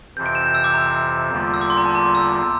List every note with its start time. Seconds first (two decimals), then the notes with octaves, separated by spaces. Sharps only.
0.17 F2 C3 E3 G6
0.26 D7
0.35 E7
0.46 G6
0.55 E6
0.64 D6
0.74 A#5
1.30 E2 D3 G3 A#3 F4
1.54 E6
1.61 D6
1.70 C6
1.78 A#5
1.86 A5
1.95 A#5
2.05 D6
2.15 E6